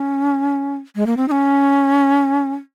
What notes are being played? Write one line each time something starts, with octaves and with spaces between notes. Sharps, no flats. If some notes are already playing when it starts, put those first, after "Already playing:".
Already playing: C#4
G#3
A#3
C4
D#4
C#4